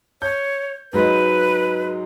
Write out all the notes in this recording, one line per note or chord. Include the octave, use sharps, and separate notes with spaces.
C#5 G6
G#2 F#3 G#3 B4